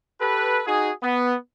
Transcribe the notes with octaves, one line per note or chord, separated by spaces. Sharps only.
G4 A4 B4
D#4 F#4 G#4
B3